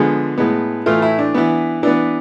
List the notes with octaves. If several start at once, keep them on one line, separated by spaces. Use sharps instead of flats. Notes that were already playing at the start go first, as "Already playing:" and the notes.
Already playing: D3 F3 G#3 B3 G#4
A2 G#3 B3
A2 E3 A3 F4
E4
D4
E3 B3
E3 B3 D4